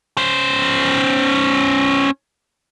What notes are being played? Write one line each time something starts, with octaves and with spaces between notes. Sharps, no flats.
C#4 C5